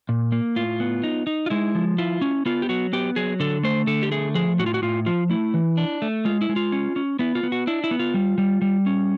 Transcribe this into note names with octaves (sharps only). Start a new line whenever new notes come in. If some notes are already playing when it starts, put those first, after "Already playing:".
A#2
A#3
A2 F4
B3
D#4
D#4
F4
G#3 E4
F3
E4 F4
C#4
B3 F4
G4
F#3 F#4
B3 G4
F#3 G#4
D3 A4
A3 C5
D3 A4
G4
A3 G#4
F3 G#4
A2 F#4
F4
F#4
A2 F4
F3 F4
A3 E4
E3
D4
A3
G#3 F4
E4
G#3
F4
C#4
C#4
B3 E4
F4
B3
F#4
D4 E4
E4
B3
F4
G3
G3
G3
C#4